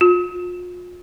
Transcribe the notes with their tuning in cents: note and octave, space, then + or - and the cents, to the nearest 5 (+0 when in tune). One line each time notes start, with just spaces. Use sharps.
F4 +40